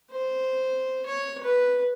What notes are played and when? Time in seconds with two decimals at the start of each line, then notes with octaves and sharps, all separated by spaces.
0.11 C5
1.06 C#5
1.43 B4